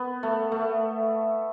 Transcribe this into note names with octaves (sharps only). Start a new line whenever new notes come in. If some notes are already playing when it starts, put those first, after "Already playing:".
Already playing: B3
A3
A3